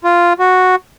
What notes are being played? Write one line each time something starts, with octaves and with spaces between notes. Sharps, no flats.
F4
F#4